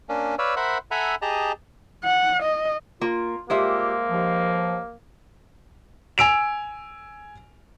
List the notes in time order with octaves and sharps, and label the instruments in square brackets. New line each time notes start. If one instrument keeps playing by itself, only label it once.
[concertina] A#3 C#4 D4
B4 C#5 D5 F5 E6
A#4 C5 E5 F#5 B5
A4 E5 F#5 G#5 A#5 B5
G4 G#4 D#5 A5 A#5
[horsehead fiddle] F#5
D#5
[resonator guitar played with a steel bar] A#3 [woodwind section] F4
[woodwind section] G3 F4 G4 [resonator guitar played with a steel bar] G#3 C5 E5 [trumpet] A#3
[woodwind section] D#2 F3
[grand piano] G#5 E6 D7 F7